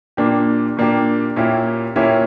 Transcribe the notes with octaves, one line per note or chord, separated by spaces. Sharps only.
A#2 A#3 D4 G4
A#2 A#3 D4 G4
A#2 A#3 C#4 E4 G4
A#2 A#3 C#4 E4 G4